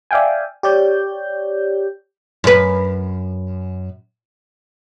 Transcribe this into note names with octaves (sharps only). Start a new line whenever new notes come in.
D5 E5 F5 G5 G#5
G4 C#5 D5 G6
F#2 B4